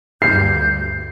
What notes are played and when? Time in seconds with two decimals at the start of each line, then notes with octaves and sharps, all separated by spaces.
0.22 D2 G2 G6 C7